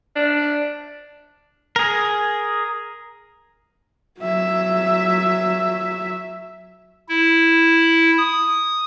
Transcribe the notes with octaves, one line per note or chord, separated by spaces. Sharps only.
D4
G#4 A#4
F#3 E5
E4
D#6